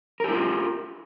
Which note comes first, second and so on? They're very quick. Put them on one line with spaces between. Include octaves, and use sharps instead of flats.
A#4 G4 E4 F4